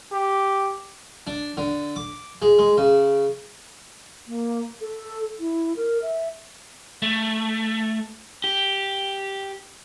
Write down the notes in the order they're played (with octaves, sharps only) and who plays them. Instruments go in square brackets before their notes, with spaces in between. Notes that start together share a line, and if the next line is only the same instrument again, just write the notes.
[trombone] G4
[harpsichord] D4
D3
D6
G#3
G#3
C#3
[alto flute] A#3
A4
E4
A#4
E5
[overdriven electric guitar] A3
G4